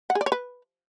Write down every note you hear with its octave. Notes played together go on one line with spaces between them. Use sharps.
F#5
G#4
D5
C#5
B4